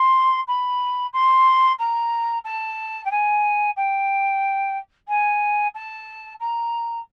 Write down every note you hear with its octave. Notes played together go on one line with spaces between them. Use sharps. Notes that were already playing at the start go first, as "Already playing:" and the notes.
Already playing: C6
B5
C6
A#5
A5
G5
G#5
G5
G#5
A5
A#5